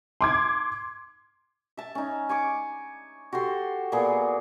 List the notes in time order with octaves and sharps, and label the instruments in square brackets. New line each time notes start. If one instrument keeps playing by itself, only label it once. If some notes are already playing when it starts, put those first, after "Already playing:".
[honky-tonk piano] C6 D6 G#6
[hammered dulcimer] E5 A5
C#4 D#4
G#5 C#6 D6
F#4 G4 A4 C6
A#2 A#3 B3 G#4